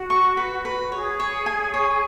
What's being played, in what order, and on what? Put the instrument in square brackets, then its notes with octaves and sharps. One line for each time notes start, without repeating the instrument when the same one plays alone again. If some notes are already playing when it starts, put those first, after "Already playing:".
Already playing: [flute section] F#4
[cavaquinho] C#6
B4
B4
[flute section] G#4 [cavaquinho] C#5
[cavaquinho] C#5
G#5
C#5